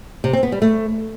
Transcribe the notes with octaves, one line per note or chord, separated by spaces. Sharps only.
C3
C4
B3
G3
A3